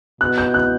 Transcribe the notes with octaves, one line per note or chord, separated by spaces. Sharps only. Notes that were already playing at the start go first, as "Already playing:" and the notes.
B2 F#6
G6
F#6